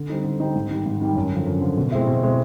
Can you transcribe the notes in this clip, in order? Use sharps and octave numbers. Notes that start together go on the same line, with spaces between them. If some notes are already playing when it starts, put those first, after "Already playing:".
Already playing: D3
G3 C4 D#4
D3
G3 C4 D#4
G#2
D#3 G3
G#2
D#3 G3
F#2
D3 F3
F#2
D3 F3
B2
G#3 C4 E4
B2
G#3 C4 E4